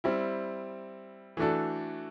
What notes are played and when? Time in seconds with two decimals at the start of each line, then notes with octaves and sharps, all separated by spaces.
0.04 G3 C4 E4
1.37 E3 A3 D4 F#4 A4